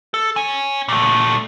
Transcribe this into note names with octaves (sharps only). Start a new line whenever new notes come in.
A4
C#5 G#5
A#2 A3